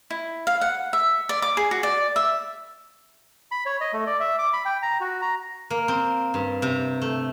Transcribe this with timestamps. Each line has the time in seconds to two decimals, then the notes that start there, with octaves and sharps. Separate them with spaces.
0.10 E4
0.47 F5
0.61 F#5
0.93 E5
1.29 D5
1.42 D6
1.57 G#4
1.71 F#4
1.83 D5
2.16 E5
3.51 B5
3.66 C#5
3.81 D#5
3.93 A3
4.06 D5
4.20 E5
4.39 D6
4.53 B5
4.65 G5
4.82 A#5
5.01 F#4
5.22 A#5
5.70 A#3
5.88 C4
6.34 G2
6.62 C3
7.02 A3